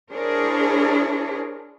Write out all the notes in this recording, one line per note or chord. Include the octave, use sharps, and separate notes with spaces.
D4 E4 G#4 A#4 C5 C#5